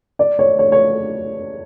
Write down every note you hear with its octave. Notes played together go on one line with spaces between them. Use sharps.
D5
C#5
C#5
C#5